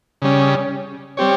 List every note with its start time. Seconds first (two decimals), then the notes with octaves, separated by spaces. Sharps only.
0.22 C#3 G3 C#4
1.17 G3 C4 G4 C#5